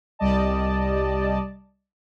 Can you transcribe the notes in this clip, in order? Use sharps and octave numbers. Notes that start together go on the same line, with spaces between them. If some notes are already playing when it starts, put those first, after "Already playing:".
C2 G3 D5 D#5 A5